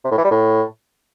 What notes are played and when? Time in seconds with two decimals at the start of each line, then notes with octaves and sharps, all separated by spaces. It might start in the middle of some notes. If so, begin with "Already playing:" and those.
0.05 C3
0.11 A2
0.18 E3
0.24 G3
0.31 A2